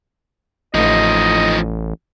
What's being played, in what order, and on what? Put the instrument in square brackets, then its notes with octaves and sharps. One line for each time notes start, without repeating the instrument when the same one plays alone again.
[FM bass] A1 [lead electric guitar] F3 D#4 [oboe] D#5